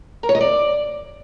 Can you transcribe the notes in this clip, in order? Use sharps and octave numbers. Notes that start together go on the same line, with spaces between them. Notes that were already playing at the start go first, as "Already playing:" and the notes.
A#4
C#5
D#5
D5